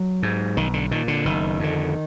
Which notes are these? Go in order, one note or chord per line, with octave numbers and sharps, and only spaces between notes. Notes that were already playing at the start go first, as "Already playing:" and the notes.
Already playing: F#3
G#2
B1 D#3
D3
A#2 D#3
D3
F#1 D#3
F2 D3